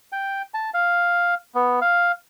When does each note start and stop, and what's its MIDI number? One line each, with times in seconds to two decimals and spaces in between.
0.12 0.42 79
0.54 0.70 81
0.74 1.34 77
1.55 1.80 59
1.81 2.12 77